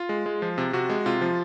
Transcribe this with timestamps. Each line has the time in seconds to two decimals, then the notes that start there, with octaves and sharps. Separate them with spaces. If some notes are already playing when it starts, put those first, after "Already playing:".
Already playing: F4
0.09 G#3
0.26 G#3
0.42 F3
0.58 C3
0.73 C3 F#4
0.90 G#3
1.06 C3 F4
1.21 F3